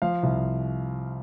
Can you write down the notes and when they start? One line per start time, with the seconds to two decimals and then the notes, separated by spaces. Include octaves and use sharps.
0.02 F3 F5
0.23 C2